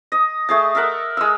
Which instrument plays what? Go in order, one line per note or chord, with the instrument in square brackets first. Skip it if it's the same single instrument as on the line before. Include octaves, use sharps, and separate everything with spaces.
[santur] D#5
A3 G#4 A5
A4 A#4 E5 F#5
G#3 E6